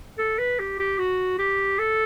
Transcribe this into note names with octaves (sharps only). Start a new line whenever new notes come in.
A4
B4
G4
G4
F#4
G4
A4